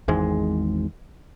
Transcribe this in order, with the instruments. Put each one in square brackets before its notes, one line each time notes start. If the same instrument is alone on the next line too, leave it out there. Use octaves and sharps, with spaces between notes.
[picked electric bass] G#1 E2 G#2 G#3